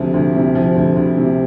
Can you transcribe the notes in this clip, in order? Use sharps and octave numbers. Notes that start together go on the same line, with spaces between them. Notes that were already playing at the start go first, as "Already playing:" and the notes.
Already playing: D2 C3 F3
D2
C3
F3
D2
D2
C3